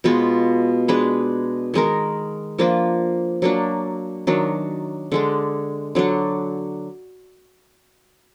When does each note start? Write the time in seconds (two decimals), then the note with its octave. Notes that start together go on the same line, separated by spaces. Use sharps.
0.04 B2 G#3 B3 F4
0.88 G#3 D4 G#4 B4
1.74 D#3 G#3 D#4 A#4
2.58 F3 A#3 D4 F4
3.42 F#3 A#3 D4
4.27 D#3 F#3 D4
5.12 D3 G#3 D4
5.95 D3 F#3 D4